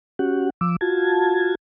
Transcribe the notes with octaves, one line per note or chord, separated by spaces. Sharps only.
C#4 F#4 G4 F#5
F3 D6 E6
F4 F#4 A5 G#6